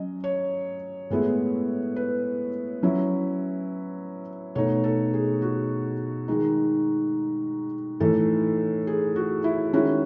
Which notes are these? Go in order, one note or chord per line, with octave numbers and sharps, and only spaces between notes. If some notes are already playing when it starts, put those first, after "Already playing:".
Already playing: F#3 C#4 D#5
C#5
A2 G#3 B3 E4
B4
F#3 C#4 E4
B2 A3 D#4 C#5
A4
G#4
F#4
D#3 G#3 D#4
A2 E3 A3 D#4 A4
G#4
F#4
E4
D#3 G#3 C#4 E4 F#4